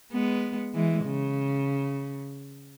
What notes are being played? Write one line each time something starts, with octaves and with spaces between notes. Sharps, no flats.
G#3 B3
E3 G#3
C#3